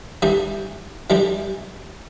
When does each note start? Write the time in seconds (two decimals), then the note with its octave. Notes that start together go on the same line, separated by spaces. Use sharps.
0.22 E3 G3 D4 G4
1.10 E3 G3 D4 G4